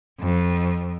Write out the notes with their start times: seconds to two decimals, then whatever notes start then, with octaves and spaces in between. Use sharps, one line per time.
0.20 F2